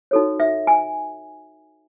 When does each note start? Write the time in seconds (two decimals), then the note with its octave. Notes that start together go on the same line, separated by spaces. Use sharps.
0.11 D#4 F#4 A4 C#5
0.40 E5
0.67 G#5